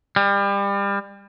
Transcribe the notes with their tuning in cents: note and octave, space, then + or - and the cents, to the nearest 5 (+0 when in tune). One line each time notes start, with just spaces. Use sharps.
G3 +30